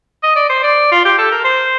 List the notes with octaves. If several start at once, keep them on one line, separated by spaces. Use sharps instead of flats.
D#5
D5
C5
D5
F4
G4
A4
A#4
C5